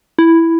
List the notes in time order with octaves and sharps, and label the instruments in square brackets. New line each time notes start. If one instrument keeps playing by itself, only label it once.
[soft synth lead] E4